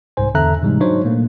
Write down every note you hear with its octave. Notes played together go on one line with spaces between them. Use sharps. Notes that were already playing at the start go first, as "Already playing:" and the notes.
C2 G#2 C5 G#5
E2 D3 A4 E5 A#5 F#6
G#2 C3 E3 G3 G#3 D#4
F#3 D4 D#4 C5 C#5
A#2 A3 A#3